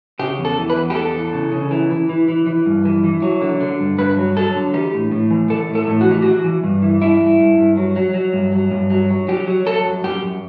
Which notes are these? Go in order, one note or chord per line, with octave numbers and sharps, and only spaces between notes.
C#3 G4
E2
A4
E3
B4
E2
G4
E2 A4
E3
C#3
C#3
E3
E3
E3
E3
E3
G2
E3
E3
F#3
D3
D3
G2
G2 B4
F#3
F#3 A4
D3
E3 G4
A2
A2
E3
E3 A4
A2
A4
A2
F#4
E3 G4
E3 F#4
E3
G2
E3
G2 E4
G2
G2
G2
F#3
F#3
F#3
G2
F#3
G2
F#3
F#3
F#3 G4
F#3
F#3 A4
F#2
F#2 G4
F#2